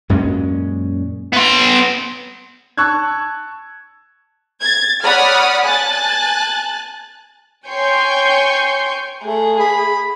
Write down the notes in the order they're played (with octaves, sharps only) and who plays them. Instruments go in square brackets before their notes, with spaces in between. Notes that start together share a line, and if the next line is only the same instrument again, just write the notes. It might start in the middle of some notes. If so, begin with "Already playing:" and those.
[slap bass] F#2 A#2 G#3 C#4
[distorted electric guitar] B3 C6
[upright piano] A5 C#6 E6 F#6 G#6
[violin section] G#6 A6
C#5 D5 F#5 B5 D#6 F6
G#5 A5 F#6 A6
C#5 G5 G#5 C6 C#6 G6
[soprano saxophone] A3 [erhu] G#4
[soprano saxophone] B5